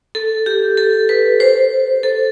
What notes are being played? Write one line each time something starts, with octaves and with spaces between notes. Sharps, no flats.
A4
G4
A4
B4
C5
A4